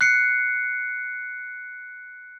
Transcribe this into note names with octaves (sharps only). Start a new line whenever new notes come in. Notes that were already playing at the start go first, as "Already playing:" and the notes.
F#6 C7 C#7